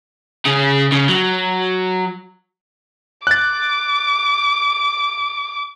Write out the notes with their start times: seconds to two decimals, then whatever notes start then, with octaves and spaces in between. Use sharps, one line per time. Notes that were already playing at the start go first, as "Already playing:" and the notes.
0.46 C#3 G#4
0.92 C#3
1.09 F#3
3.27 D6 F#6 A6